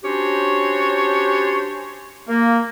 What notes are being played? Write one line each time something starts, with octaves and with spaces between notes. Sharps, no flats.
C#4 D4 F#4 G4 C5 C#5
A#3